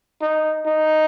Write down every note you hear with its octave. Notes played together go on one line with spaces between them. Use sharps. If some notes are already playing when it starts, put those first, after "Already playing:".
D#4
D#4